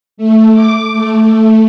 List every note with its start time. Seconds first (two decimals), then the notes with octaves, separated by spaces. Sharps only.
0.17 A3
0.52 D6
0.92 A3